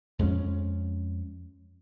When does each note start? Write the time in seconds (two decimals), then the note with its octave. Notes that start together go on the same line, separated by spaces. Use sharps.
0.19 F2 G#3 B3 C#4